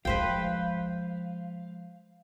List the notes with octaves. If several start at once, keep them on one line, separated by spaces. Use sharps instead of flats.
F3 G#3 B4 C5 F5 G5